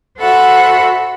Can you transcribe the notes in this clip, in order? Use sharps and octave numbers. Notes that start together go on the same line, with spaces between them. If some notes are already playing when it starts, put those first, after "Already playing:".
F#4 A4 C5 E5 F#5 B5